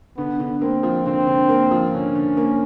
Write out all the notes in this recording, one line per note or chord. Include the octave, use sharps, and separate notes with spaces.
D3 B3
D3
A#3 C4
F3
D3 C4
D3
A#3
F3
D3 C#4
D3
A#3